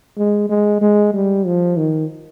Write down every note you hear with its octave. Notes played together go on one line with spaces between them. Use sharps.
G#3
G#3
G#3
G3
F3
D#3